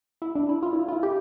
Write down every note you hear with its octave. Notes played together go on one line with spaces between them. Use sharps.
E4
D4
E4
F4
E4
F4
E4
G4